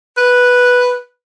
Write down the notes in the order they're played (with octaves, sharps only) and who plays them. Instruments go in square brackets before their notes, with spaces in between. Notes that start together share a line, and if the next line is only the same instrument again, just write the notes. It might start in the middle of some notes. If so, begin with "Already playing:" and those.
[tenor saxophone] B4